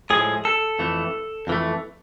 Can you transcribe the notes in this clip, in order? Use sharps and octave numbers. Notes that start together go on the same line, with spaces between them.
A2 F3 G#3 G#4
A4
F2 E3 A3
F2 E3 A3